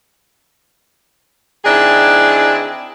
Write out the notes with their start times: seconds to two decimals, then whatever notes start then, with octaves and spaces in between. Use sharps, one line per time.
1.65 D#3 C4 D4 E4 G#4